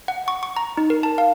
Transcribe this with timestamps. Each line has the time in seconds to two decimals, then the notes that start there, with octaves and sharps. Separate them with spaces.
0.08 F#5
0.28 C#6
0.43 C#6
0.56 A#5
0.77 D#4
0.90 A#4
1.03 A5
1.18 F5